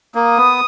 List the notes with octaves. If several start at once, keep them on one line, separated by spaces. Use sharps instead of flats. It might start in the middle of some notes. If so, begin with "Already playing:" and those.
A#3 D#6
B3